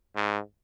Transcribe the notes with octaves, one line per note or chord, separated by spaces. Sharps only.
G#2